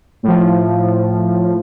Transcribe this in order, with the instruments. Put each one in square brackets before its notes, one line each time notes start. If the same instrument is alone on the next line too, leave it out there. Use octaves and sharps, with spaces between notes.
[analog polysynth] A2 F3